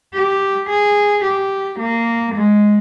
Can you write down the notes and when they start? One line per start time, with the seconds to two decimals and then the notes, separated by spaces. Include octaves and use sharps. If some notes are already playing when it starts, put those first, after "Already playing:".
0.14 G4
0.69 G#4
1.24 G4
1.79 A#3
2.35 G#3